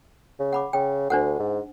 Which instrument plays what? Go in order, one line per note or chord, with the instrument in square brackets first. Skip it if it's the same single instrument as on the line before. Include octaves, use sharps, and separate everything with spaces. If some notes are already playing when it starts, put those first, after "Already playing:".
[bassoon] C#3
[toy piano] F#5 B5 D6
[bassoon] C#3 [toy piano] G5
[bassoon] D2 [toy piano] D4 C5 F#5
[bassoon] G#2